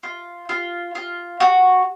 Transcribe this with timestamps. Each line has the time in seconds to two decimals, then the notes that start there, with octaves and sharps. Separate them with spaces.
0.03 F4
0.49 F4
0.95 F4
1.40 F#4